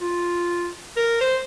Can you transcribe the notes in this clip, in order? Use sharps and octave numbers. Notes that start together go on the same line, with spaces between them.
F4
A#4
C5